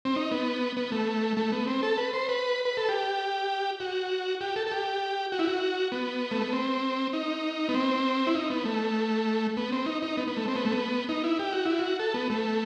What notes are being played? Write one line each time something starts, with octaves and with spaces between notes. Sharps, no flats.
C4
D#4
B3
B3
A3
A3
B3
C4
A4
B4
C5
B4
B4
A4
G4
F#4
G4
A4
A4
G4
F#4
E4
F#4
B3
A3
B3
C4
D#4
B3
C4
E4
D#4
B3
A3
B3
C4
D#4
D#4
B3
B3
A3
C4
B3
A3
B3
D#4
E4
G4
F#4
E4
F#4
A4
B3
A3